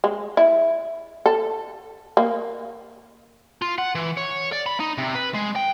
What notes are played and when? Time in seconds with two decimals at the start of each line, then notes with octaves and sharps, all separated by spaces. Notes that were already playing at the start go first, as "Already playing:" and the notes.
0.04 G#3
0.37 E4
1.26 A4
2.17 A#3
3.62 F4
3.78 F#5
3.95 E3
4.17 C#5
4.52 D5
4.66 B5
4.80 D#4
4.98 C3
5.15 B4
5.34 G#3
5.56 G5